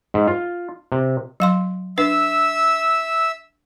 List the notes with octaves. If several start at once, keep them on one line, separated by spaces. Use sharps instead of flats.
G#2
F4
C3
F#3 F5 C6
D4 B4 E5 E6